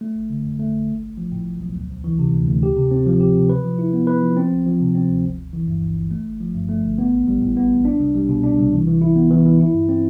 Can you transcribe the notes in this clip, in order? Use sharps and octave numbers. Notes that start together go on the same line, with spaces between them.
A3
G1
D3
F2
A3
G1
B1
B1
F3
A2
B1
B1
D2
D2
E3
C3
D2
D2
G4
C3
C4
F3
G4
C3
B4
F3
E4
B3
B4
F3
C4
D2
F3
C3
C4
D2
G1
G1
E3
G2
G1
G1
A3
G1
F3
G2
A3
G1
B3
A1
G3
A2
B3
A1
D4
C2
G3
B2
D4
C2
E3
E3
E4
B3
E3
E3
E4
G2
C4